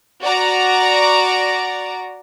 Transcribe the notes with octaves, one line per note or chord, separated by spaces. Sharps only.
F#4 D5 A#5